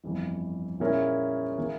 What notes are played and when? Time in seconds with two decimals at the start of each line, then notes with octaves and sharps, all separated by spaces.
0.04 G1 F2 E3
0.80 A#2 G#3 C#4 E4 A#4
1.57 E3 A#3 E4